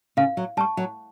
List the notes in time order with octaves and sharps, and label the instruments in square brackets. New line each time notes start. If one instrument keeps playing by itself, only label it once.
[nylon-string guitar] C#3 [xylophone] F5
[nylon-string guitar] F#3
[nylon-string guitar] G3 [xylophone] A5 C#6
[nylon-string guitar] F#3